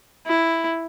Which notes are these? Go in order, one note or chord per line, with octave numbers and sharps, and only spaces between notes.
E4